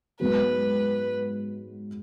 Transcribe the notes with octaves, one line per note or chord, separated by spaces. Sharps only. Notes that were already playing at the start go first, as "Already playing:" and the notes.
G#2 F#3 B3 F#4 B4